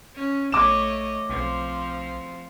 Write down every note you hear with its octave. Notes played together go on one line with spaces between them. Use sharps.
C#4
A#1 A3 C#5 D#5 D6 E7
B1 F3 C4